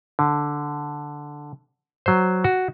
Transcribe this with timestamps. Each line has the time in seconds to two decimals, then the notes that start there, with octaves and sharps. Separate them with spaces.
0.19 D3
2.06 F#3 C5
2.44 F#4